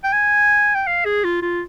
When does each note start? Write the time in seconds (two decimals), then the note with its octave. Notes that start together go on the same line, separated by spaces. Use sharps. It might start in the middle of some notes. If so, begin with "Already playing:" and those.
0.04 G5
0.13 G#5
0.75 G5
0.87 F5
1.05 G#4
1.24 F4
1.42 F4